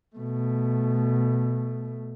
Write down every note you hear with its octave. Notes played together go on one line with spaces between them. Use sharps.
B2 A3